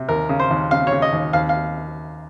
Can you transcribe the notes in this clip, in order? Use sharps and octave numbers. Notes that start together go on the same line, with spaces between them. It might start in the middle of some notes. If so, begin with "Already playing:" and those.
Already playing: C3
D#2 A#4
C#3
C5
D#2
C#3 F5
C#5
C#3
D#5
D#2
D#2 F5
F5